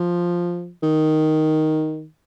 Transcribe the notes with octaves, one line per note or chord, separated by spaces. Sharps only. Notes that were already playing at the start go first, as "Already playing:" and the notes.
Already playing: F3
D#3